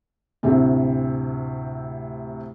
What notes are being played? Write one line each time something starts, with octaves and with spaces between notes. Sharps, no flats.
D2 A2 C3 C4